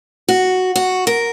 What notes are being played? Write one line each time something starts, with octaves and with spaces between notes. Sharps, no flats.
F#4
F#4
A#4